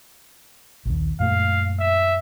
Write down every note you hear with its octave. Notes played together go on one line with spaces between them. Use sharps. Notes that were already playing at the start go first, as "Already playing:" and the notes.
A#1 D#2
F#2 A#2 A3 F5
E5